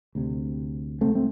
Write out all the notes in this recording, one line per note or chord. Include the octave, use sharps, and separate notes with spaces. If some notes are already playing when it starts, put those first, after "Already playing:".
D2 C3
C2 C3 A3 C4
A3 C4